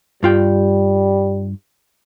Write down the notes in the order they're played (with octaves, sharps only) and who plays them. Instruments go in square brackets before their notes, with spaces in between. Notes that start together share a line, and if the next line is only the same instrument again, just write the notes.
[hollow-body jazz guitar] G2 F4 G5 [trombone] G3